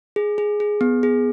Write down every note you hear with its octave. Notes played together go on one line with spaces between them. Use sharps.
G#4
G#4
G#4
B3
G#4